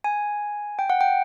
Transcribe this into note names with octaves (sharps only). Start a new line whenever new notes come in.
G#5
G5
F#5
G5